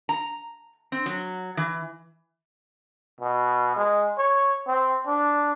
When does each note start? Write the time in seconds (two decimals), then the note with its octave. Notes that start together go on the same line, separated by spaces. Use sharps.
0.09 A#5
0.92 C4
1.06 F#3
1.57 E3
3.21 B2
3.76 G#3
4.18 C#5
4.67 C4
5.07 D4